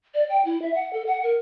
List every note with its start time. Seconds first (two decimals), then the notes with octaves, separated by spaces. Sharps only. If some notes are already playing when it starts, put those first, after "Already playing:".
0.14 D5
0.29 G5
0.45 E4
0.62 E5
0.74 F#5
0.93 A4
1.07 F#5
1.23 A#4